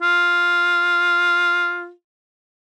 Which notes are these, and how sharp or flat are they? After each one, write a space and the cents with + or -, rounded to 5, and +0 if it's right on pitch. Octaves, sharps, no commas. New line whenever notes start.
F4 +5